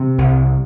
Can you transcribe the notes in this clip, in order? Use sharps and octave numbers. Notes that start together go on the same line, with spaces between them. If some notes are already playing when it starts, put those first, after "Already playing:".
Already playing: C3 C4
C2